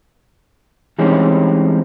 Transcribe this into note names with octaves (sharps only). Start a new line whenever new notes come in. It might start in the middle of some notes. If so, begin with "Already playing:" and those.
E3 G3 G#3 C4 C#4 D#4